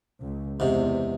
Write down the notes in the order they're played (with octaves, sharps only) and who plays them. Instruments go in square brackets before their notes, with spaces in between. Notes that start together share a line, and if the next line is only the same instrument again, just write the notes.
[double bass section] C#2
[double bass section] E2 [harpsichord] G#2 C3